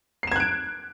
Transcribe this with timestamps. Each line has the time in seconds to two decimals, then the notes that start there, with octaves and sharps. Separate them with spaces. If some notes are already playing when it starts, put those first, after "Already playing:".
0.23 C7
0.27 E7
0.32 G#6
0.36 F#6
0.40 D7